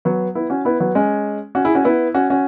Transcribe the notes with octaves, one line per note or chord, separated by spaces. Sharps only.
F#3 B3
B3 E4
C#4 F#4
B3 E4
F#3 B3
G#3 C#4
C#4 F#4
E4 G#4
C#4 F#4
B3 E4
C#4 F#4
C#4 F#4